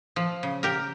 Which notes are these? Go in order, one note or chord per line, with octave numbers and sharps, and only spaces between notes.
F3
C#3
G4 A#4